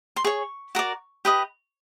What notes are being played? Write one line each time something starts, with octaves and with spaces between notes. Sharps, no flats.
C6
G#4 C#5 C#6
F#4 A#4 D5
G4 B4 D#5